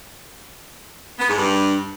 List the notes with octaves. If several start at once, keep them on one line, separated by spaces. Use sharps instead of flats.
B3
G#2
G2